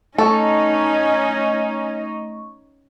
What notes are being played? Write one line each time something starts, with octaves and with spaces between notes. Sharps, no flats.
A3 C#4 D#4 A4 C#6